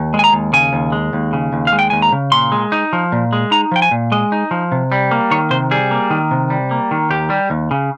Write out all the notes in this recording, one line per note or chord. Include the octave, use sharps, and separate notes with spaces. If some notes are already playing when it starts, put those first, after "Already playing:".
Already playing: D#2
G#3
G#5
A#5
D#2
C#3 G#5
D#2
G#3
D#2
C#3
D#2
F5
G#3
G5
D#2 G#5
A#5
C#3
A#2 C6
G#3
D#4
F3
A#2
G#3
D#4 A#5
F3 G5
G#5
A#2
G#3 D#5
D#4
F3
C3
G3
A#3
D#3 C#5
C3 C5
G3 G#4
A#3
D#3
C3
G3
A#3
D#3
D#2 G4
G3
D#2
C#3